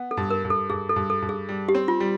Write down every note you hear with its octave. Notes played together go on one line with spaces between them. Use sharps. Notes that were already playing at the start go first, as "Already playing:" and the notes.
Already playing: B3
A4
G2
A#4
G2
A4
G2 G#4
A4
G2
A4
G2
G#4
G3
G4
C4
F4
G3